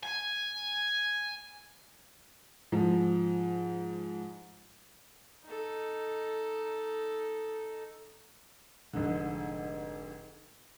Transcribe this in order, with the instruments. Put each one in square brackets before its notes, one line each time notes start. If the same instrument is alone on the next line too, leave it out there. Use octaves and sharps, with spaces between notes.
[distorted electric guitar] G#5
[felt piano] G#2 F3
[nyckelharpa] D#4 A4
[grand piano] F1 G#2 D3